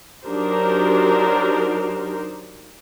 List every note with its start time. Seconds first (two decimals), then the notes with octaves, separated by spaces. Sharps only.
0.25 F#3 D4 D#4 G4 A#4 C5